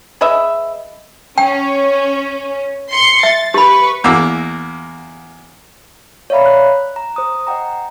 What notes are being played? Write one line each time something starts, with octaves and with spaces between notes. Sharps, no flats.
G#4 B4 D#5 E5
C#4 G5
C6 C7 C#7
E5 A6
G4 B4 B5 C#6
E2 A#3 F#4 D6 E6
C#5 D5 E5 F5 A#5 B5
F#6
A#5
C5 D#6
D#5 F#5 G5 A#5